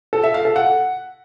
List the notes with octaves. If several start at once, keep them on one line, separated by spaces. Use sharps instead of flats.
A4
E5
F5
A4
F#5